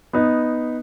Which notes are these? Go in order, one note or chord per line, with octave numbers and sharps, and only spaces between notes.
B3 D#4